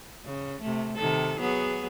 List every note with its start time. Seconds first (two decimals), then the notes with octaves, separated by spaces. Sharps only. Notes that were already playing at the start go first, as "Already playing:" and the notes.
0.25 C#3
0.61 C3 A3
0.96 C3 D#3 A4
1.40 F#3 B3 G#4